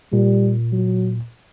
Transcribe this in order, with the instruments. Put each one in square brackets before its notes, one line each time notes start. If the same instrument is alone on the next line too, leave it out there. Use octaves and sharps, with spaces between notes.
[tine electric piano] A#2 [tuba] G3
[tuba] F#3